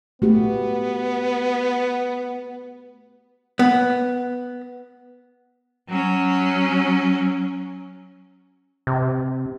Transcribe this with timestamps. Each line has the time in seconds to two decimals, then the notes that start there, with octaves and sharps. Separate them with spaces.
0.22 A3 B3 F#4 G4
3.59 B3
5.89 F#3 C#4
8.87 C3